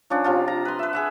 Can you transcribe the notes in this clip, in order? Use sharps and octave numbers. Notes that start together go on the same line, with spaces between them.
F3 C#4 D4
C3 F3 F4
A#5
B4 C6
B4 E5
G#4 E5 F#5